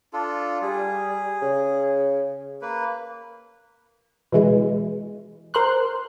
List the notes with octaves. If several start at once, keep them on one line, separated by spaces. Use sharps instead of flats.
D4 F4 A4
G3 G#4
C#3
A#3 B4
B2 E3 G#3
A#4 C5 C6 F#6